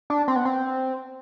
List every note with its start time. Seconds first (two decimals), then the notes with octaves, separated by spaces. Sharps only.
0.10 D4
0.28 C4
0.36 B3
0.45 C4